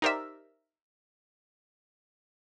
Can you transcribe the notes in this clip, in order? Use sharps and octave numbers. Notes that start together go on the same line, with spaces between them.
D#4 G4 A#4 C5 D5 E5